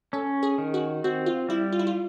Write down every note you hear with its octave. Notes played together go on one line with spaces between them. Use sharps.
C#4 A4
G#4
D#3
F#4
C4 F#4
F4
G3 E4
F4
E4
F4